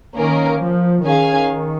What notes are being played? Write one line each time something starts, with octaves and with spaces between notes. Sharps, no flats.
D#3 A#3 C#4 A#4
F3
D#3 C#4 G#4 F5 G#5